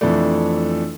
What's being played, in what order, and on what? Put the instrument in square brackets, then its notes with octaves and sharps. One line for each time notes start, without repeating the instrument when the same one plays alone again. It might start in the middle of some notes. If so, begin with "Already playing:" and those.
[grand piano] F2 E3 A3 D4